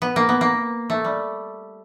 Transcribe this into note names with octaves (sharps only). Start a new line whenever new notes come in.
B3
A#3
B3
A#3
A3
G3